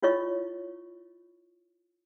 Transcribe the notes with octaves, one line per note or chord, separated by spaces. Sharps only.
E4 F4 C#5 D#5 C#6